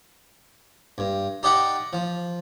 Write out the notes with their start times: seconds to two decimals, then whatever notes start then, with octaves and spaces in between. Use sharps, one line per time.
0.98 G2
1.43 D#4 G4 D5 D#5 F#5
1.93 F3